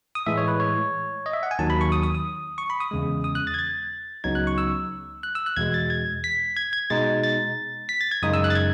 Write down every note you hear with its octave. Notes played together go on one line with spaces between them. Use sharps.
D#6
A2 E3 G#3 E5
C#5
B4
C#5
D#5
E5
F#5
G#5
D#2 D#3 F#3 A5
B5
C#6
D#6
D#6
D#6
C#6
B5
D#6
E2 C#3 G#3
D#6
F#6
A6
G#6
A6
C#2 C#3 F#3 B3 D#4 G#6
F#6
C#6
E6
F#6
E6
F#6
E2 B2 G#3 G#6
A6
G#6
B6
G#6
G#6
B2 G#3 D#4 A6
A6
B6
A6
G#6
F#2 C#3 G#3 D#4 D#6
E6
F#6
A6
G#6